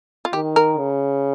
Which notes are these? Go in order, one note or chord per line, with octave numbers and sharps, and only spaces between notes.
F4
D#3 G4
A#4
C#3